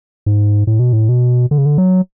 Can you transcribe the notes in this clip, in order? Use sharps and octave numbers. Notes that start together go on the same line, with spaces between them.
G#2
A2
B2
A2
B2
D3
C#3
D3
F#3